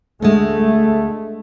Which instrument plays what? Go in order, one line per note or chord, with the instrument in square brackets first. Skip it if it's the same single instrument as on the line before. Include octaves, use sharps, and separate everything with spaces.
[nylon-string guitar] D2 G#3 [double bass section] A3